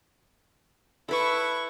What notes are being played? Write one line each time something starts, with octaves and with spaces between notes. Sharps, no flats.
E4 A4 B4 C#6